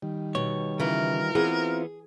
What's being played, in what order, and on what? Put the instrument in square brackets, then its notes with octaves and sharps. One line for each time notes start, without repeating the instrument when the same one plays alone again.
[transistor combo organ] D#3 G3
[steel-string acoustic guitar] B2 [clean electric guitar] C#5
[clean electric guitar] C#3 [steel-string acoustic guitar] E3 F4 [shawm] A#4
[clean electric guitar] E3 B3 [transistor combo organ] C4 E4 F4 [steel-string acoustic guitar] G#4